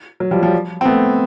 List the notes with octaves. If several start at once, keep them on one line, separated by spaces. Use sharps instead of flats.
F#3
F3 G3
F3 G3
C4
A3 B3